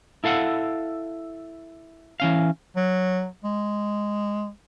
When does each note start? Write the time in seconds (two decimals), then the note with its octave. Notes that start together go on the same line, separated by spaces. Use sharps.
0.24 E4 A4 F5 F#5
2.20 E3 C#4 F5
2.76 F#3
3.44 G#3